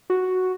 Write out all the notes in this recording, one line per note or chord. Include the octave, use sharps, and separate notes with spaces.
F#4